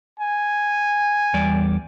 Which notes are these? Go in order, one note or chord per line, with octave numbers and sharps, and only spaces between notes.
G#5
E2 G3 D5